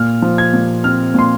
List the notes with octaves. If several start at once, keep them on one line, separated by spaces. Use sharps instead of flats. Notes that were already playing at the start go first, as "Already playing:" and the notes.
Already playing: A#2 F6
F3
G#6
A#2
C4 F6
A#2 C6